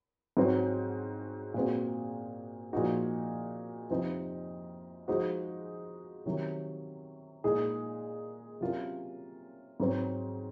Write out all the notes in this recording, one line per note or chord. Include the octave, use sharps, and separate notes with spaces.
G#2 F#3 C4 F#4 C#5
A#2 G#3 C4 F#4
A#2 F3 G#3 D#4 F#4
F2 C3 F3 C4 D#4
F3 G#3 D#4 F#4 C5
C3 D#3 F#3
A#2 G#3 D#4 G#4
C3 F#3 C#4 F4 A#4
G#2 F#3 C4